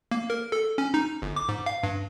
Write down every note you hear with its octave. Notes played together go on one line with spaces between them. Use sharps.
A#3
A#4
A4
C#4
D#4
G1
D6
G#2
F5
G2